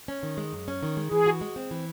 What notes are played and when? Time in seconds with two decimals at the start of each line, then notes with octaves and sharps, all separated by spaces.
0.08 C#4
0.23 D#3
0.37 G#3
0.53 F#2
0.68 C#4
0.83 D#3
0.97 G#3
1.11 E3 G#4
1.26 F#4
1.41 G#3
1.56 C4
1.71 E3